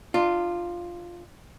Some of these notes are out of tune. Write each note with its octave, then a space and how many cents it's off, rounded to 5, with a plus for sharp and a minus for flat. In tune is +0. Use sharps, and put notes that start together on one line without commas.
D4 +40 F4 +0